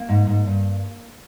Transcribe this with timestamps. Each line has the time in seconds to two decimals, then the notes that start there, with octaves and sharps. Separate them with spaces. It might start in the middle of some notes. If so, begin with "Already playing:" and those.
Already playing: A#3
0.09 G#2
0.27 G#2
0.46 G2